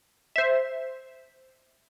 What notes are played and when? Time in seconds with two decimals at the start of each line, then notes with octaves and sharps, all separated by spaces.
0.36 C5 E5